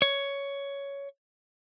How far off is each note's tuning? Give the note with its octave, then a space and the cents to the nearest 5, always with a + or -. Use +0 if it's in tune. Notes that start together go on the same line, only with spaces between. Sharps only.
C#5 +10